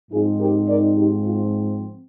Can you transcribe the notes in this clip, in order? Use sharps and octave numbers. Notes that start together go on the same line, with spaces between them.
G#2 F3 C4 D#4 F4 G#4
G4 A#4
A#4 D5
D#4 G4
F4